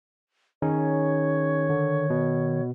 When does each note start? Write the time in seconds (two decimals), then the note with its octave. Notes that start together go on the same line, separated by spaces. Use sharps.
0.62 D#3 C#4 D#4 G#4 C#5
1.70 D3
2.10 B2